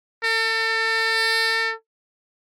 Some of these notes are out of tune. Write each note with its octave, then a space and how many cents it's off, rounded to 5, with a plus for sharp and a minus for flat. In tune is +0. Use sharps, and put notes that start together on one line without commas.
A4 +35